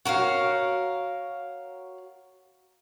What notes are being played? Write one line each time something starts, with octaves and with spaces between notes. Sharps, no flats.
F#4 A#4 C#5 F5